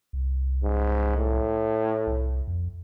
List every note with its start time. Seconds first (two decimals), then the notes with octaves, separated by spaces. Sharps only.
0.13 C2
0.63 G#2
1.17 A2
2.07 C2
2.47 F2